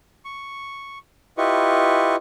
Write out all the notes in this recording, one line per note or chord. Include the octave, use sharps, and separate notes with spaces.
C#6
E4 F4 G4 B4 D#5 C#6